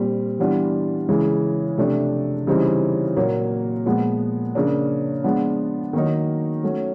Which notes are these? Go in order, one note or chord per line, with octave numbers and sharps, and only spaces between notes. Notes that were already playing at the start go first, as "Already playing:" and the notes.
Already playing: A#2 G3 C4
E3 G3 B3 D4 F4
C#3 E3 G#3
C3 F3 A3 D4
C#3 E3 G3 C4 D#4
A#2 F#3 A#3
A#2 F3 G#3 B3
C#3 F3 A#3 D4
F3 G#3 B3 D4 F4
D#3 F#3 A#3 D#4
F#3 A3 C#4